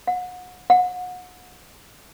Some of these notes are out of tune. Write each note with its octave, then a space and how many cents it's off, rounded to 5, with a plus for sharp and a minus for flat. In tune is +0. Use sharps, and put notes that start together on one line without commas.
F#5 -30
F#5 -30